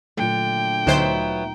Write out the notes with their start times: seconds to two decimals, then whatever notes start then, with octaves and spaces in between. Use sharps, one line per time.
0.17 A#2 D3 F#3 A3 G5
0.87 D2 F#3 B3 D#4 C5 E5 G6